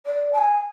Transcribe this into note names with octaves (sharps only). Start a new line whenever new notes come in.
D5
A5
G#5